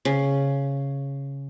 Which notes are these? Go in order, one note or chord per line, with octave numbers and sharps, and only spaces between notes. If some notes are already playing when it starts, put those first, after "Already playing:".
C#3